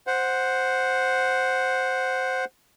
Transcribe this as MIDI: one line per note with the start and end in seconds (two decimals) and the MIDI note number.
0.07 2.45 72
0.07 2.45 78